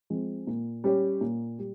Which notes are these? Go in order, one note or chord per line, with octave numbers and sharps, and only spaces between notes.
F3 G#3 C4
A#2
G3 C#4 G4 C#5
A#2
G3